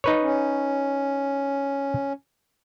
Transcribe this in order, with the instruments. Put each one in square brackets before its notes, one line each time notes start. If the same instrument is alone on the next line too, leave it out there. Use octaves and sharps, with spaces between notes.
[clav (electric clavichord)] D#4 B4 C#5
[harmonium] C#4